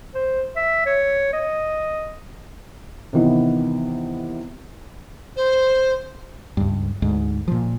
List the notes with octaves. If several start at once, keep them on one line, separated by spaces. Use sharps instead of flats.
C5
E5
C#5
D#5
C3 D#3 E3 B3 E4
C5
C#2 G2
D2 G#2
A#2 F3